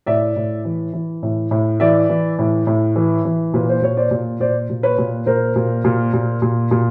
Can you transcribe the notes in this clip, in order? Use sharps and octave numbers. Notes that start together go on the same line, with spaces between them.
A2 D5 E5
A2
E3
E3
A2
A2
E3 D5 E5
E3
A2
A2
E3
E3
A#2 B4
C5
A#2 C#5
C5 D5
A#2
A#2 C5 D5
A#2
B4 C#5
A#2
A#2 A#4 C5
A#2
A#2
A#2
A#2
A#2